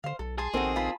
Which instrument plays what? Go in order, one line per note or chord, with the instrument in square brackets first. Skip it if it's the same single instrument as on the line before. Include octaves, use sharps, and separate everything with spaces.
[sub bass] D3 [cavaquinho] C5 F5
[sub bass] B1 [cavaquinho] A4
[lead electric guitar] G#4 [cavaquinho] A5 C6
[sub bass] A#1 [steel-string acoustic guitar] D#3 C4 A4 [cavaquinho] F#4 C6
[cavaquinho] F4 A5 B5